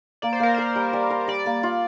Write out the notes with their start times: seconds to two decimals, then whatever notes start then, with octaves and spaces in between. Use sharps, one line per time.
0.22 A#3 D5
0.33 C5
0.40 A#3 A#4
0.54 A#4 C5
0.76 G3
0.93 G3
1.10 A#4
1.28 G3 D5
1.46 A#3
1.63 F4